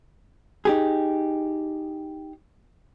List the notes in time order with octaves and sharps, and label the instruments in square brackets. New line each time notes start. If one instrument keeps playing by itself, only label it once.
[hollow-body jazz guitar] D#4 G4 G#4